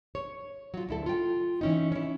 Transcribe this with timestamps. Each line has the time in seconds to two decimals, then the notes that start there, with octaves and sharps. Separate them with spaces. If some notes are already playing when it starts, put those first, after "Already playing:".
0.15 C#5
0.74 F#3 F4
0.89 D2 E4 A4
1.06 F4 G5
1.61 E3 C#4 D#4
1.92 C#4 E4